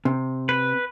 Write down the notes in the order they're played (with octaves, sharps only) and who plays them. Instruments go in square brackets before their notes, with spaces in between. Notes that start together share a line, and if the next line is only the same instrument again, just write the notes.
[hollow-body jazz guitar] C3
[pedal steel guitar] B4